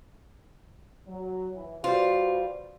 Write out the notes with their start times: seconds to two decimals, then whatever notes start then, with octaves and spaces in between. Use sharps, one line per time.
1.07 F#3
1.54 E3
1.84 G3 F4 F#4 B4 C5